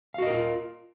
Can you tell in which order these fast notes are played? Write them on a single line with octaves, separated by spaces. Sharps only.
F5 F#4 D#5 A#4 F4